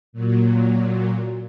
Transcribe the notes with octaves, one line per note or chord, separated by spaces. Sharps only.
A#2 F#3